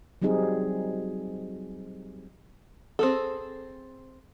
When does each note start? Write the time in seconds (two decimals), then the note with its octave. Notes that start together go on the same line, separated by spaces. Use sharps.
0.22 F#3 G3 C4 D#4 G#4
2.99 C4 G#4 A4